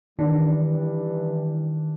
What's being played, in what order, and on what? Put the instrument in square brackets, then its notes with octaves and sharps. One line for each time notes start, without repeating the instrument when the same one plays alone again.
[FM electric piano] D#3 [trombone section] E3 G3 [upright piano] D4